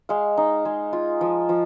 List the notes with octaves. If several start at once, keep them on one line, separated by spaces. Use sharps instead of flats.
G#3 F5
D#4
G#3
F4
F3
F3